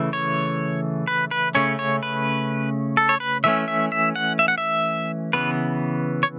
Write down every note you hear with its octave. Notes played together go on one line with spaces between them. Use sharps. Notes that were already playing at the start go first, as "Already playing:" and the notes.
Already playing: C#3 E3 A3
C#5
B4
B4
C#3 A3 C#4 C#5
C#5
B4
A4
C#5
B4
E3 A3 C#4 E5
E5
E5
F#5
E5
F#5
E5
C#3 E3 B3 B4
C#5